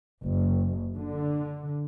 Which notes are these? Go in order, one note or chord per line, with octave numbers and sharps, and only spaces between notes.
F#1
D3